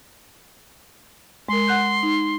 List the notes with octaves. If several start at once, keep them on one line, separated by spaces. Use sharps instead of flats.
G#3 A#4 C6
F#5 F#6 G6
D#4